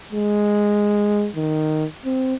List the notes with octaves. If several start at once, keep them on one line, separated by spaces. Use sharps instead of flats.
G#3
D#3
C4